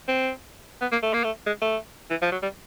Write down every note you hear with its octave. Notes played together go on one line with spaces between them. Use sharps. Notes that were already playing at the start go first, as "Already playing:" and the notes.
C4
B3
A#3
A3
A#3
A3
G#3
A3
E3
F3
F#3
G3